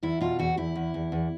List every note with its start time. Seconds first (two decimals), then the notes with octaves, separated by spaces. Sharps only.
0.03 E2 E4
0.21 B2 F4
0.39 E2 F#4
0.57 E2 E4
0.76 E2
0.94 E2
1.12 E2